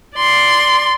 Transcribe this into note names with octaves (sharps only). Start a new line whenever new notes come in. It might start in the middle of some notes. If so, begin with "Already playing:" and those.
D5 C6